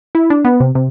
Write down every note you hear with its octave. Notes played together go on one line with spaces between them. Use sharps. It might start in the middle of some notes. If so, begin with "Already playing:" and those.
E4
D4
B3
C3
C3